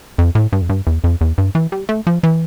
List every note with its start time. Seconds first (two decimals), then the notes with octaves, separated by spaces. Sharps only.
0.18 F2
0.35 A2
0.53 G2
0.62 F2
0.69 G2
0.87 E2
1.04 F2
1.21 E2
1.38 G2
1.55 E3
1.72 G3
1.89 A3
2.07 F3
2.23 E3